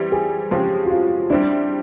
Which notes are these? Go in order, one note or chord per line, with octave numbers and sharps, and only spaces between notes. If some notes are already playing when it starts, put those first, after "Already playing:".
Already playing: E3 G3 C4 G4
G#4
C#3 F3 G#3 C4 G4
F#4
F4
G3 C4 D4 E4